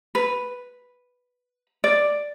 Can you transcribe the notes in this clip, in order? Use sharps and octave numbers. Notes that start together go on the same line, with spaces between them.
B4
D5